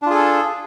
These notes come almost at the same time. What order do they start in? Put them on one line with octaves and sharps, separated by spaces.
D4 F4 G#4 A4